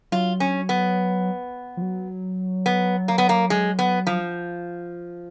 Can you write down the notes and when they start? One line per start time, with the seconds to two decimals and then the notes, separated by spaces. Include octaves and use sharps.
0.12 F#3 F4
0.40 C#4
0.69 B3
1.77 F3
1.82 F#3
2.66 B3
3.08 A#3
3.18 B3
3.29 A#3
3.50 G#3
3.79 B3
4.07 F3